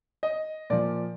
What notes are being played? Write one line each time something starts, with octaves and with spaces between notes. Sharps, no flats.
D#5
A#2 F3 D5